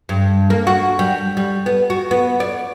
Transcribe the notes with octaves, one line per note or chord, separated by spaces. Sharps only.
G2
A#3
F#4
G3
G3
B3
F#4
B3
D5